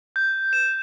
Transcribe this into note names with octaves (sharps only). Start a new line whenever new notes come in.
G6
E7